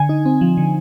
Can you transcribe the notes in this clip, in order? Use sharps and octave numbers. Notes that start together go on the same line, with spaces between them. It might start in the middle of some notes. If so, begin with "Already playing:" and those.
Already playing: D3 G#5
D#4
C4
F3
D3